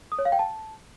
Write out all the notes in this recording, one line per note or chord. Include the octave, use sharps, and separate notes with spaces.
D#6
C#5
F5
G5
A5